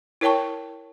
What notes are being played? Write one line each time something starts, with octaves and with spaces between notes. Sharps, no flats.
E4 A#4 C#5 G5 A5 C#6